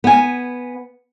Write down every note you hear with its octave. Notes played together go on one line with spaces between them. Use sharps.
B3 G#5